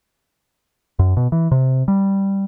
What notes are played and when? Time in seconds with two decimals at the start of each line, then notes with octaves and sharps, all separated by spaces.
0.99 F#2
1.17 B2
1.32 E3
1.52 C3
1.88 G3